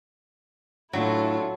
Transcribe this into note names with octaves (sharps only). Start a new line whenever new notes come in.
A2 F#3 D4 E4 F4 A4